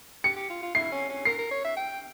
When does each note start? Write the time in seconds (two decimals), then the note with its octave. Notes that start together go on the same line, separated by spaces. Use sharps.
0.24 G4 C#7
0.37 G4
0.50 F4
0.62 F4
0.75 E4 C7
0.92 C#4
1.09 C#4
1.25 A#4 C7
1.38 A#4
1.51 C#5
1.64 E5
1.77 G5